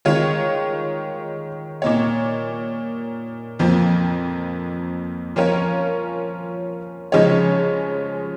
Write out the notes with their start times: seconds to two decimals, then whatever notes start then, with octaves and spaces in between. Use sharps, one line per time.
0.05 D#3 G#3 F4 C#5
1.82 A#2 A#3 D#4 C#5
3.59 F2 F3 A#3
5.36 F3 C#4 F4 A#4 C#5
7.12 C#3 F3 G#3 D#4 C#5